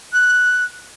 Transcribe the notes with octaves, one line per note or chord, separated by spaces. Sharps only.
F#6